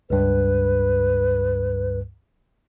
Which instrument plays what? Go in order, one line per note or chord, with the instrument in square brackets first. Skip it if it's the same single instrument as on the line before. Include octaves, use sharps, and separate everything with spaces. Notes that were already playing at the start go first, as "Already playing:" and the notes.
[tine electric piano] C#2 G2 [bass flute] B4